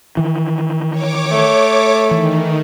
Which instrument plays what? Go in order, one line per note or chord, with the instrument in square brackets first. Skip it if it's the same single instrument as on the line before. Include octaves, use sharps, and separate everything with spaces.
[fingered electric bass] D#3 E3
[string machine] C#5 D6
[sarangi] A3
[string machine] D#3 [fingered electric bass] E3